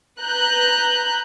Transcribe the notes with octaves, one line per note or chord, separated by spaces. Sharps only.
B4 A#5 F#6 G6